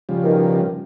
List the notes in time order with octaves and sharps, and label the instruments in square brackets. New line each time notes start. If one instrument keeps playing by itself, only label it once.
[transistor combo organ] C#3 F3 G3
[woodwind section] F#2 B2 D#3